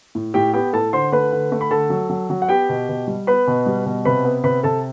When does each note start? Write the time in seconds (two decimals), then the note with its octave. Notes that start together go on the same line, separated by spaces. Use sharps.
0.15 A2
0.34 A2 G4 G5
0.54 B3 G4 G5
0.73 A2 A4 A5
0.93 D3 C5 C6
1.12 A3 B4 B5
1.32 D3
1.52 A3
1.61 B5
1.71 D3 A4 A5
1.90 F#3
2.10 F#3
2.30 F#3
2.42 F#5
2.49 B3 G4 G5
2.69 B2
2.89 B2
3.08 G3
3.27 B3 B4 B5
3.47 B2
3.66 G3
3.86 B2
4.05 C3 B4 B5
4.25 B3
4.44 C3 B4 B5
4.63 C3 A4 A5